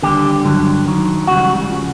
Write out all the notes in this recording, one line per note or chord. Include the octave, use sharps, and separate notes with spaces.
D#2 D3 G3 G4
G2 D3 F#3
F#2 D#3 F#3
C#2 C#3 E3 G3 F#4
C#3 F3